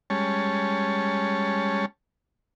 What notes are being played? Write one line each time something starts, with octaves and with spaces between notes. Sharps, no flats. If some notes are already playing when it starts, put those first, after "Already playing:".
G3 G#3 C#4 C#5 A5